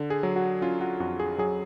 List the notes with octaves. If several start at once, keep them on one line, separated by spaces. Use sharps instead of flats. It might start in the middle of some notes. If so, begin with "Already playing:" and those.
Already playing: D3
G#4
F#3
F#4
C#4 F4
F#4
F2 F#4
G#4
F#3 G#4